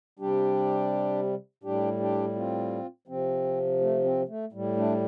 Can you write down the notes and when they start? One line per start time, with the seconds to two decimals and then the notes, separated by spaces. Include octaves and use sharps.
0.19 C3 G3 D4 G4
1.63 A2 G3 D4 G4
2.00 D4 G4
2.35 C4 F4
3.08 C3 F3 C4
3.81 A3
4.04 C4
4.28 A3
4.53 A2 G3
4.76 A3 D4